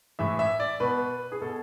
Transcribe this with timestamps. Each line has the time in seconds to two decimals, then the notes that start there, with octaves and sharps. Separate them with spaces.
0.19 A2 E3 E5
0.39 E5
0.60 D5
0.80 B2 B4
1.32 G#4
1.41 B2 A4